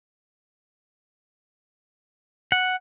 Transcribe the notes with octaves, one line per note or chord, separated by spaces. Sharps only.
F#5